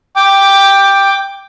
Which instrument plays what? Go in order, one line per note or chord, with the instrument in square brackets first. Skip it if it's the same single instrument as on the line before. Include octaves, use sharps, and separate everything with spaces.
[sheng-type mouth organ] G5 D6